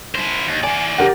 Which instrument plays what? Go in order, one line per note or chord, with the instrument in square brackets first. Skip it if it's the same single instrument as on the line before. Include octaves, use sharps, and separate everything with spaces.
[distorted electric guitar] E4 C5
D#2
[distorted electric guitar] E3 D5 [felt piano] G#5
[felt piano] G4 A#4 F#5